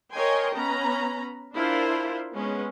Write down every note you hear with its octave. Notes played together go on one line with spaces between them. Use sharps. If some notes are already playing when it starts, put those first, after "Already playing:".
A#4 C#5 D#5 G5 G#5 C6
B3 C#4 A#5 B5
D4 E4 F4 A#4 C5
G#3 B3 C#4